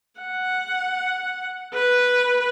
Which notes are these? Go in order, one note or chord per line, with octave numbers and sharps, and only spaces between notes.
F#5
B4